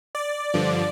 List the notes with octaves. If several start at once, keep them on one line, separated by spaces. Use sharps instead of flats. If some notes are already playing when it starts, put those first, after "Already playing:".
D5
G2 D3 F3